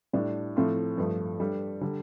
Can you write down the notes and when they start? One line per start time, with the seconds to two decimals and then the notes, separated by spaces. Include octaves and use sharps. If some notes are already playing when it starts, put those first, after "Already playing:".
0.13 A2 G3 D4
0.56 A2 F3 A3 C4 F4
0.97 G2 F3 A3
1.40 G3 D4 A4
1.81 D3 G3